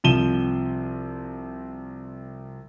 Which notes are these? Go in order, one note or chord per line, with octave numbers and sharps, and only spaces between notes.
C2 F3 C4 D#7 E7 G7